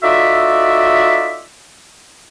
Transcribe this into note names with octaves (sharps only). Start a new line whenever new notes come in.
D#4 F4 F#4 A4 D5 E5